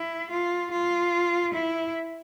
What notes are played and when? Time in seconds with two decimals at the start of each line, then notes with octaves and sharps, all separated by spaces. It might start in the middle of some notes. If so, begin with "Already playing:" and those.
Already playing: E4
0.30 F4
0.72 F4
1.54 E4